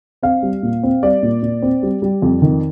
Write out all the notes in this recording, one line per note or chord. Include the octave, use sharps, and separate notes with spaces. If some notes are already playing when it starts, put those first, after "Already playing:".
C4 F5
G3
A#2
C4
G3 D5
A#2
A#2
C4
G3
G3
F2
D#3